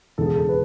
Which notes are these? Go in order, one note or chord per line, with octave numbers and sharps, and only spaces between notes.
E1 E2 C#3 E3 A4
G#4
A4
B4